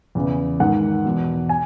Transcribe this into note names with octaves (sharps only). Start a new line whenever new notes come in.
E2 C#3 E3
G#2 D#3 F#5
E2 B2
G#5